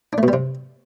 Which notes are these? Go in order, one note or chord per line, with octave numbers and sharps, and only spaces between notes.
D4
A3
B2
G3
C3